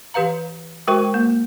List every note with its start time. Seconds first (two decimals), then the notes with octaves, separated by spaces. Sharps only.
0.14 E3 G4 B4 F5 A#5
0.88 G#3 F#4 A#4 C5 G5 C#6
1.14 A#3